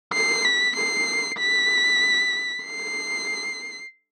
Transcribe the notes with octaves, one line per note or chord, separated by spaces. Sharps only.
C7
B6
C7
B6
C7